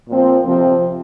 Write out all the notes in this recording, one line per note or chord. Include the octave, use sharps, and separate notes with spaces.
A#2 F3 C4
F2 C3 F3 C4